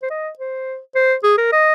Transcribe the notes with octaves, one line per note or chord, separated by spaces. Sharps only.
C5
D#5
C5
C5
G#4
A#4
D#5